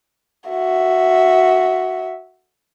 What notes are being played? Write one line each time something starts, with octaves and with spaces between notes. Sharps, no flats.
F#4 E5